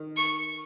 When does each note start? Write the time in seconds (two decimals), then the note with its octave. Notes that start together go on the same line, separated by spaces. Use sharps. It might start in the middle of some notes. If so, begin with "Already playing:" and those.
Already playing: D#3
0.17 C#6